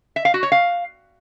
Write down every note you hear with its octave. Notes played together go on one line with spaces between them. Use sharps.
E5
F5
F#4
C#5
F5